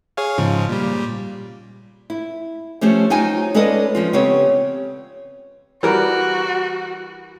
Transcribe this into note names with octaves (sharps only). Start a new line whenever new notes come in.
G#4 C#5 F5
G#2 C#3 F3
A#2 G3
E4
F3 A3 C#4 G4 C5
F#3 D#4 F4 C5 G5 G#5
G#3 C#4 A4 B4 D5 D#5
F3 C#4 F4
C#3 B3 C4 G4 C#5
E3 G3 F#4 A#4